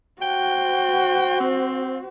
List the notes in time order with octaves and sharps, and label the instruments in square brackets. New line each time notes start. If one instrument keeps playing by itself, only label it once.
[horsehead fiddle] F#4 C5 [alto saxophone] G5
[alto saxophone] C4